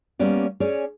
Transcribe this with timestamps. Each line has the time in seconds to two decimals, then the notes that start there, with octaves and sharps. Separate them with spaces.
0.19 G3 A#3 B3 C#4 D5
0.60 C#4 G#4 C#5 D5